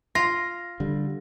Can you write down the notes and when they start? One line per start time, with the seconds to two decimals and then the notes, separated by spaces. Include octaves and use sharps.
0.15 F4 A#6
0.80 D3 G3